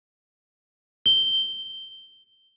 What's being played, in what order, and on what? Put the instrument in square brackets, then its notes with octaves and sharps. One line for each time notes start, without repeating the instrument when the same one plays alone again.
[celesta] G7